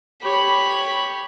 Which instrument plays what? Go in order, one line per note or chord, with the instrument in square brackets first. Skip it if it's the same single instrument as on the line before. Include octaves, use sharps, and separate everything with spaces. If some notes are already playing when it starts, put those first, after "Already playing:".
[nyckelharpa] G4 C#5 [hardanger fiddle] B5